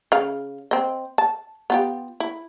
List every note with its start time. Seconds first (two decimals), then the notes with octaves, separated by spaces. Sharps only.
0.12 C#3 F5
0.71 C4 D#5
1.18 A5
1.70 B3 F4 G4
2.20 E4